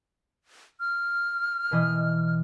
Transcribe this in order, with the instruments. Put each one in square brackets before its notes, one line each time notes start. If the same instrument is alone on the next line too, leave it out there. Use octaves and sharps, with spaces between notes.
[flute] F6
[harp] B2 E3 D#5